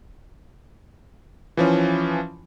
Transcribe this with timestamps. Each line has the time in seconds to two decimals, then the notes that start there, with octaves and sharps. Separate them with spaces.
1.57 E3 F3 C#4